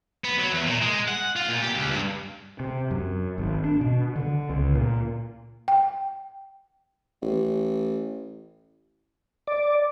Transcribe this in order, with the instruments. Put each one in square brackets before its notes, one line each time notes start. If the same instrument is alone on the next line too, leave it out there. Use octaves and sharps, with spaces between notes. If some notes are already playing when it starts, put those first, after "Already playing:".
[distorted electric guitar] B3
F#3
E2
A#2
G#3
F#5
F4
A#2
G4
C#2
G2
[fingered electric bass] C3
F#2
G#1
D4
B2
D3
C#2
A#2
[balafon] G5
[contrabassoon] A1
[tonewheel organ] D5